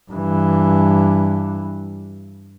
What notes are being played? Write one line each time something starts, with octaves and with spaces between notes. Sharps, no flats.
G2 E3